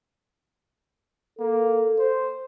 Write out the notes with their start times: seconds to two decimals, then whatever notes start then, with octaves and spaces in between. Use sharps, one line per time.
1.39 A#3 A4
1.99 C5